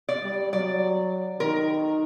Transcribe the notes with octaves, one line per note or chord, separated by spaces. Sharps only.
D5
G3
F#3 D5
D#3 A#4